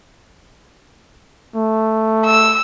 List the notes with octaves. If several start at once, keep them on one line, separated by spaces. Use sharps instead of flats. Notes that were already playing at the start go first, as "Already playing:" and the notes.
A3
E6